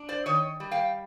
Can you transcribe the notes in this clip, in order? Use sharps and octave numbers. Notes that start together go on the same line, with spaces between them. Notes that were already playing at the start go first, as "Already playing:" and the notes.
Already playing: D4
C5 D5
D#3 C#5 D#5
G3
F5 G5